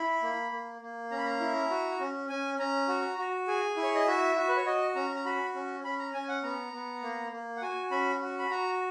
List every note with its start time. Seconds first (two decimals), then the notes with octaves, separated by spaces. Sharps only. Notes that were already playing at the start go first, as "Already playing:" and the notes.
Already playing: E4 B5
0.22 A#3
0.52 A#3
0.82 A#3
1.11 C#4 A#5
1.18 B5
1.26 A#5
1.40 E4
1.70 F#4
2.00 C#4
2.30 C#4 G#5
2.59 C#4 A#5
2.88 F#4
3.18 F#4
3.47 G#4 G#5
3.77 E4
3.83 C#5
3.95 D#5
4.07 F#4 E5
4.36 F#4
4.48 B4
4.57 C#5
4.66 F#4 D#5
4.95 C#4 A#5
5.16 A#5
5.25 F#4 B5
5.55 C#4
5.84 C#4 B5
5.99 A#5
6.14 C#4 G#5
6.29 F#5
6.43 B3 A#5
6.73 B3
7.02 A#3
7.32 A#3
7.56 F#5
7.62 F#4 G#5
7.91 C#4 B5
8.21 F#4
8.39 B5
8.50 F#4 A#5